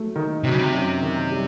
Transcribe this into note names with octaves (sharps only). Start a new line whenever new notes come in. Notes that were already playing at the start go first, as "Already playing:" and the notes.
Already playing: F#3 A3
D#3
C3 F#3
C#3
C3
F#2
D#3
G3